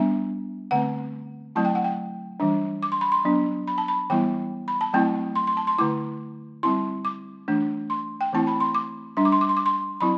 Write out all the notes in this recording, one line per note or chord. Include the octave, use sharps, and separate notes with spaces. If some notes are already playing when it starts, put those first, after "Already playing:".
Already playing: G3 B3 D4 E5
D3 A3 C4 F#5
F#3 A3 C4 E4 A5
G5
F#5
G5
E3 G3 D4
D6
C6
B5
C6
F#3 B3 D4
B5
A5
B5
E3 G3 B3 E4 G5
B5
A5
F#3 A3 C4 E4 G5
C6
C6
A5
C6
D3 A3 E4 D6
G3 C4 E4 C6
D6
E3 A3 D4
C6
G5
E3 A3 C4 E4 A5
B5
C6
D6
G3 D4 C6
D6
C6
D6
C6
D6
C6
F#3 C4 E4 B5